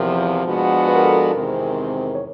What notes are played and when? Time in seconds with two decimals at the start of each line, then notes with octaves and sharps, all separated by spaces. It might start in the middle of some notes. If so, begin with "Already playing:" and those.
Already playing: E2 C3 F3 A#4
0.43 F3 G#3 B3 D4 F#4
0.88 B4
0.96 A#4
1.04 A4
1.12 A#4
1.33 E2 C3 D#3 G#3 C4
2.15 C#5